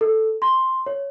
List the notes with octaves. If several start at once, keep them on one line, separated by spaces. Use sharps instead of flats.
A4
C6
C#5